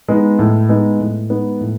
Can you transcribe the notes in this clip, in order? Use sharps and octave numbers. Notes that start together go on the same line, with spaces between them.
G#3 B3 D#4
A2
G#3 B3 D#4
A2
G#3 B3 D#4
A2